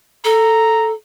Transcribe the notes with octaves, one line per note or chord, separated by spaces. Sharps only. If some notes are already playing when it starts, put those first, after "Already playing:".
A4 A#5